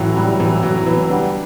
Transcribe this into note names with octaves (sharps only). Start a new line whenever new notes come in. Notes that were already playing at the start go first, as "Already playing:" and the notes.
Already playing: A2 E3 F#3
F#3 G3
A2 E3
A2 F#3
E3 B3
D3 G3